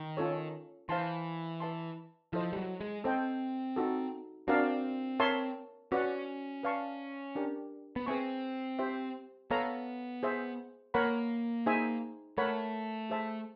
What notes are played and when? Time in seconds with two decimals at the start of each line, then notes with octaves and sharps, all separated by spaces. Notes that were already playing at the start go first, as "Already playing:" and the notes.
Already playing: D#3
0.17 C#4 F4 A4 C#5
0.89 E3 C5 F5 A5 C6
1.60 B4 E5 A5 C6
2.33 F3 E4 A4 C5 D#5
2.53 G3
2.57 F#3
2.81 G#3
3.04 C4 A4 C5 D#5 G5
3.76 D#4 F#4 A4
4.48 C4 D4 F#4 A#4 D5 F5
5.20 A#4 C#5 E5 A5 C6
5.92 C#4 F#4 B4 D5 F#5
6.63 B4 D5 F5 A5 C#6
7.35 D4 G4 A#4
7.96 B3
8.06 C4 G#4 B4 E5 G#5 C#6
8.79 G4 C5 E5
9.51 B3 A4 C#5 F5 A#5
10.23 G#4 C5 E5
10.94 A#3 A#4 C#5 F#5 B5
11.66 D#4 G#4 C5 E5 G#5
12.38 A3 A#4 C#5 F#5 B5
13.10 G#4 C5 E5 A5